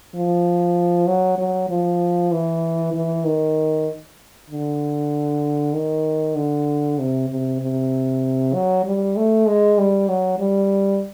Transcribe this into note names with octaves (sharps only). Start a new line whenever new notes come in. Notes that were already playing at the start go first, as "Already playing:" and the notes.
F3
F#3
F#3
F3
E3
E3
D#3
D3
D#3
D3
C3
C3
C3
F#3
G3
A3
G#3
G3
F#3
G3